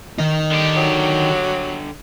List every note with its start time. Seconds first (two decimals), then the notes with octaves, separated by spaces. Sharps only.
0.18 D#3 D#4
0.52 D3 G4
0.77 F#3